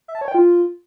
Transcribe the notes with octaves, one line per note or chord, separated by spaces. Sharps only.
E5
A5
C#5
G5
F4